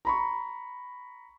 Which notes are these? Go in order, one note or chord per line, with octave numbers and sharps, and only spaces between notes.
A#5 B5 C#6